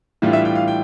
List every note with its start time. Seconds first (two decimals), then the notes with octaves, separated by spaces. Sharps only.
0.22 A2 E3 G3 D4 F4
0.33 E5
0.45 G5
0.55 F5
0.68 G5